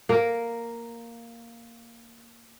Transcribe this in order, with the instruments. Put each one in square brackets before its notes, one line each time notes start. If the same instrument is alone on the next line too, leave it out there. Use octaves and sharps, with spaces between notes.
[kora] A#3 A#4